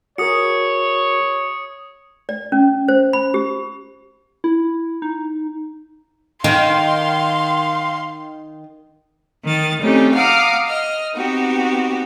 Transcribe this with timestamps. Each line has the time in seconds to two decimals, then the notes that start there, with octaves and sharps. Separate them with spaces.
0.18 F#4 G#4 A#4 C#5 D#6 C#7
2.29 D5
2.52 C#4
2.88 C5
3.13 B5
3.34 G4
4.44 E4
5.02 D#4
6.44 D#3 F5 C6
9.44 D#3 A6
9.80 G3 A3 C4 C#4 D#4 G4
10.14 F5 F#5 A#5 D6 D#6 F6
10.67 D#5 F6
11.13 B3 C4 D#4 F#4 G4